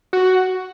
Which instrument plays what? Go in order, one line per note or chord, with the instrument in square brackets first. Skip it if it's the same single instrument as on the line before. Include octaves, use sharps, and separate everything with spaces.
[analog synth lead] F#4